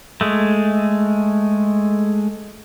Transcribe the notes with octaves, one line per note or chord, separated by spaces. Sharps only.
G#3 A3